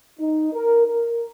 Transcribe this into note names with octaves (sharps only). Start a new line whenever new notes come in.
D#4
A#4
A#4